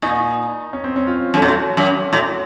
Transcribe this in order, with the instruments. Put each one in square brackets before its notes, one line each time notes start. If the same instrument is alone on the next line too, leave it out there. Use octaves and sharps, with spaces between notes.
[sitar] A#2 [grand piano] D#4
[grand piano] C#4
C4
C#4
F4
[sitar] F#2 [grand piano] A4
[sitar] A2 [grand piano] F#4
[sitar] F#2
[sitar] A2 [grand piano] F#4